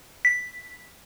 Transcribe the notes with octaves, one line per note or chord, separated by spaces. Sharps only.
B6